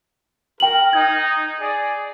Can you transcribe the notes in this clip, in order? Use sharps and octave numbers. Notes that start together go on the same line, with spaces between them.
A#4 G5 F#7
D#4 G#6
G#4 D5